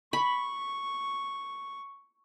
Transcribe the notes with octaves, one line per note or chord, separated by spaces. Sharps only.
B5 C#6